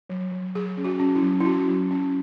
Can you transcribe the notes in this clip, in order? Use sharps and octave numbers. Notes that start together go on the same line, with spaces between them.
F#3
F#3
F#3 G#4
C#4
F#4
C#4
E4
F#3
E4
C#4 F#4
F#3
C#4